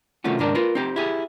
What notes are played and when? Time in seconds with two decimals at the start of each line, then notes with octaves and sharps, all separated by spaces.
0.24 C3 D#3 A3 C#4 F4 F#4
0.38 C#2 G#2 D#3 D4 A#4 D5
0.55 F4 A#4 B4
0.75 C4 D#4 G4
0.96 E4 G4 G#4